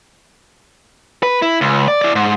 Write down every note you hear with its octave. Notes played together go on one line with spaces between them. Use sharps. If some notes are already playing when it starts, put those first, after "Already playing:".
B4
E4
C#2
D5
E4 D5
G#2